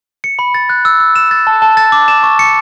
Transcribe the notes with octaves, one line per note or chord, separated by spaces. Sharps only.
C#7
B5
A6
F#6
E6
E6
E7
A6
A5
A5
A6
D6
E7
C#6
C#7